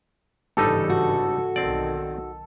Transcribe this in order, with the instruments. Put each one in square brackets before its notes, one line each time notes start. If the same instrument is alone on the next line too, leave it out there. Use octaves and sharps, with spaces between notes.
[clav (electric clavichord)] G1 G3 D#4 [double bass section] G#2 C#3 E3 [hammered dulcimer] A4
[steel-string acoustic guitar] F#4
[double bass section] B1 D#3 [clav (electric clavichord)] C4 D5